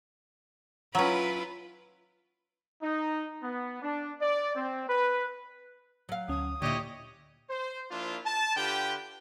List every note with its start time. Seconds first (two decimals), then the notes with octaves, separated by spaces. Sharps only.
0.95 F#3 C#4 E4 F4 B4
2.82 D#4
3.42 B3
3.83 D4
4.21 D5
4.55 C4
4.88 B4
6.09 F#3 F5
6.29 D2 C#4 D#6
6.62 A#2 D3 E4 G4 C#5 D#5
7.50 C5
7.91 F3 A#3 D4 E4 F4
8.25 A5
8.56 D3 F4 G4 B4 G5